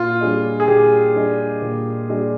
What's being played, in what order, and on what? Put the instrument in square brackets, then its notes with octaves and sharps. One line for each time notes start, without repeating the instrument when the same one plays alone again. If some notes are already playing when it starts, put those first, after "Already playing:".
Already playing: [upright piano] A#2 [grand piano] F4
[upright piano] G3 D4 G#4 D#5
[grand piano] G#4
[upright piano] A#2 [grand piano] G4
[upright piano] G3 D4 G#4 D#5
A#2
G3 D4 G#4 D#5